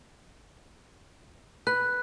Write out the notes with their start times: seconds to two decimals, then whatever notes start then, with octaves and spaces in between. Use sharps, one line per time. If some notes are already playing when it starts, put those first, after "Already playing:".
1.67 B4 F#6